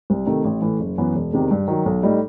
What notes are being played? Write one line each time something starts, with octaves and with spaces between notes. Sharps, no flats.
C2
C3 D#3 A3
A1
A2 E3
F#1
F#2 E3 B3
E1
E2 C3 D#3
G2
D#3 F#3
B1
A2 G3 D#4